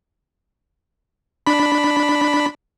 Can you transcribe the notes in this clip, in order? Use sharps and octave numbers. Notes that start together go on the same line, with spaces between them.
D4 B5